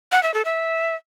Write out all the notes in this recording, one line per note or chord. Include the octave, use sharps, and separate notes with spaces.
F#5
E5
A4
E5